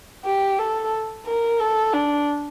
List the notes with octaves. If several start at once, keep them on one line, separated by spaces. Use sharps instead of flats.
G4
A4
A#4
A4
D4